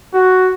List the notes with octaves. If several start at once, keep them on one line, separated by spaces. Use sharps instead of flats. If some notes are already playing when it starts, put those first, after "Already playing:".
F#4